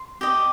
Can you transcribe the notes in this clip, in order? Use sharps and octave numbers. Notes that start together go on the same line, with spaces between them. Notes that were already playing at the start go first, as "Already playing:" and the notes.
Already playing: C6
G4 D#5